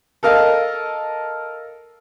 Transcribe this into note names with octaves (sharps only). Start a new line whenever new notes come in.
A4 A#4 D#5 F5